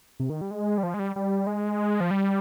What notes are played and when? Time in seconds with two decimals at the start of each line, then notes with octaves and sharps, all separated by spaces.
0.20 C3
0.30 D#3
0.41 G3
0.51 G#3
0.78 G3
0.83 F3
0.94 G#3
0.99 G3
1.16 G3
1.47 G#3
2.01 F3
2.11 G3